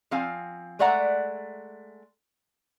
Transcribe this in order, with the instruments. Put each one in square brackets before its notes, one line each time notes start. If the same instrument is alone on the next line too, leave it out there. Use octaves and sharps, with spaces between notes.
[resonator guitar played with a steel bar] F3 C4 F5 G#5
G#3 A3 D5 E5 F#5 A#5